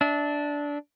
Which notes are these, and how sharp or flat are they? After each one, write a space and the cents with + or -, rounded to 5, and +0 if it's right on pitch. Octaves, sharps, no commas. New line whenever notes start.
D4 -10 E5 -30